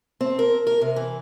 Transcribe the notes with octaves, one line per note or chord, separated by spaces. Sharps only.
C4
A#4
A#4
C3
E3